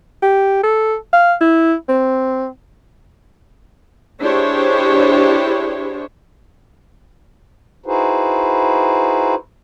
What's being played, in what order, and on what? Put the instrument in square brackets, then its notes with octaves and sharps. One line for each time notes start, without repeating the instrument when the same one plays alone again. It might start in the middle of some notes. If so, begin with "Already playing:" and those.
[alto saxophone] G4
A4
F5
E4
C4
[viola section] D4 E4 G4 G#4 C5 C#5
[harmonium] D#4 E4 F#4 G#4 B4 C5